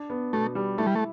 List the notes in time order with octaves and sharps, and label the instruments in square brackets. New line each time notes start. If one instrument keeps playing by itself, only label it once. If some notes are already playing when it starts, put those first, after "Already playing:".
Already playing: [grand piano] D4
B3
[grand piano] B2 [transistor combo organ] A3
[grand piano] G3
[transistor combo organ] A3 [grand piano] E4
[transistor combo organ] G3
A3